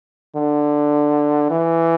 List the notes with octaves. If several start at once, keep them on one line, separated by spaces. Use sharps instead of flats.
D3
E3